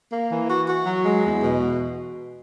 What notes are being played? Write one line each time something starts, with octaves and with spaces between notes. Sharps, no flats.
A#3
E3
F#4
F#4
F#3
G#3
E2
B2